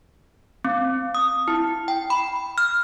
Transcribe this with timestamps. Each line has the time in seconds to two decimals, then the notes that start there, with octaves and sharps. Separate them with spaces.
0.65 C4
1.15 D#6
1.48 E4
1.88 G5
2.10 B5
2.58 F6